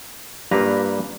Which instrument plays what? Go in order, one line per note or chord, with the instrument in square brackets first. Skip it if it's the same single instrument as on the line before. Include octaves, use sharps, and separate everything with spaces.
[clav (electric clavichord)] G2 A#2 A#3 G4 B4 A#5